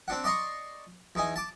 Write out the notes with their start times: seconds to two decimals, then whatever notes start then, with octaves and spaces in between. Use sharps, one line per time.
0.08 C4 D4 F#5
0.24 D5 D#5 A#5 C6 C#6
1.15 E2 D#4 G#5
1.36 A5 D6